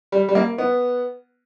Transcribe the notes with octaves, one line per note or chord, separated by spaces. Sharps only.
G3
G3
A#3
B3